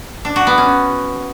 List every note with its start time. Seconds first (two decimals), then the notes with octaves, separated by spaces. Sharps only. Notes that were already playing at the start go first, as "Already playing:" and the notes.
0.25 D4
0.36 F#4
0.47 B3
0.58 C#4